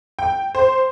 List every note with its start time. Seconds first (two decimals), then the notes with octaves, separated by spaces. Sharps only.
0.19 G5
0.55 C5